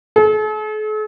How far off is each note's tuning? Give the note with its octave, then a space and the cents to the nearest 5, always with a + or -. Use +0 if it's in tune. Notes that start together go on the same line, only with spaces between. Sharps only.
A4 -45